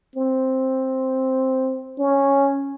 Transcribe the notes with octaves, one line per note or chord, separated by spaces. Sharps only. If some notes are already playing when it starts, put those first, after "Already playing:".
C4
C#4